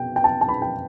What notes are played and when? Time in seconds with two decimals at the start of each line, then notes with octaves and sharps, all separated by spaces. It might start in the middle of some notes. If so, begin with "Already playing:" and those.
Already playing: B2 G5
0.16 G5
0.24 A5
0.41 A5
0.49 B5
0.62 G5